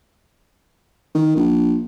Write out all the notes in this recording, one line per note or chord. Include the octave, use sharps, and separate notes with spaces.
D#3
A#1